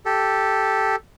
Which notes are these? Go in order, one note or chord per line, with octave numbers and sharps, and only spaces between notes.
G4 A4